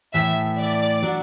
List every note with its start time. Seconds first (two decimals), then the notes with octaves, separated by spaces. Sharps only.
0.14 A2 E3 A3 E5
0.59 D5
1.02 F#3 D4 F#4